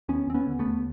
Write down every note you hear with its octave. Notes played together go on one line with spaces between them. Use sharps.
D#2 B3 C#4
D#2 C4
B3 C#4
D3
A3 B3
D#2